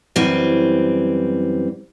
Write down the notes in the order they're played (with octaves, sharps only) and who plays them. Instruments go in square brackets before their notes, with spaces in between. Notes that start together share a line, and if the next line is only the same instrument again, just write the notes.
[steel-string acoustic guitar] F#2 E3 G3 C4